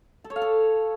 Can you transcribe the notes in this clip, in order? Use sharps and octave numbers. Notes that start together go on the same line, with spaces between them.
A4
C#5
F5
A4